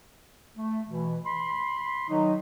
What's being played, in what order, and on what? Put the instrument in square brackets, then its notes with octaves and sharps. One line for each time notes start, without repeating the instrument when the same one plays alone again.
[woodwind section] A3
B2 E3
B5 C6
[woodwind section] D#3 F#3 [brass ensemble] D#4